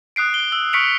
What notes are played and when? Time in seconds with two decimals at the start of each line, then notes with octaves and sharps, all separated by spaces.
0.16 D#6 F#6 C7 D7
0.34 G7
0.52 E6
0.73 C#6 F6 B6 C#7 D7 F7